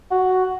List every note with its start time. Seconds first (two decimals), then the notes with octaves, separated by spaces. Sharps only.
0.11 F#4